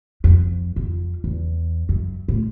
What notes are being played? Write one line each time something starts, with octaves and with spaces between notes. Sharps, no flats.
F2
F2
E2
F#2
A2